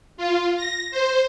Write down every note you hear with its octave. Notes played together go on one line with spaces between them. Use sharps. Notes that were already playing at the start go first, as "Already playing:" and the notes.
F4
A#6
C5